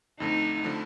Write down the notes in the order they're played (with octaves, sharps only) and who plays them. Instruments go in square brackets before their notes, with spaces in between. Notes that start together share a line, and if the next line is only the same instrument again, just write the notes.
[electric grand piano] F2 D3 F3 A3 [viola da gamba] D#4
[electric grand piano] D3 F3 A3